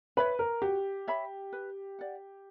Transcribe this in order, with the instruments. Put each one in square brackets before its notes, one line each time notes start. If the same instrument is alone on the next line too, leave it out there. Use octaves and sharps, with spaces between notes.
[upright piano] B4 [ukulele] C#5 E5 B5
[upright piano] A#4
[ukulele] F#4 [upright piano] G4
[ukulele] C#5 E5 B5
B4
D5 F#5